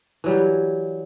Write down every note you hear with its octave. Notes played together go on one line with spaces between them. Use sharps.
E3 F#3 G3